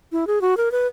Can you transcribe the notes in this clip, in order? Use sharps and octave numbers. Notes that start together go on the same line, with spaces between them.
E4
G#4
F#4
A#4
B4